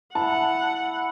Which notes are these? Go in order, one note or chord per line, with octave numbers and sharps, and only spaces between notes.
E4 F#5 A5